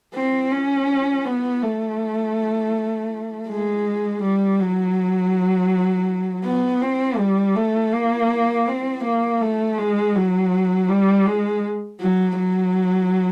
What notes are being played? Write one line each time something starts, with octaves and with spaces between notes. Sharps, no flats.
C4
C#4
B3
A3
G#3
G3
F#3
B3
C4
G3
A3
A#3
C4
A#3
A3
G#3
F#3
G3
G#3
F#3
F#3